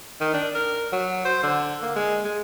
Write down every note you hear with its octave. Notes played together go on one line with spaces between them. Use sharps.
D#3
D4
A#4
F#3
C5
D3
A#3
G#3
G#3